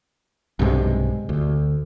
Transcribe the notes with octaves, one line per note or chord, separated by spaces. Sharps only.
B1 G2 C3 G#3
D2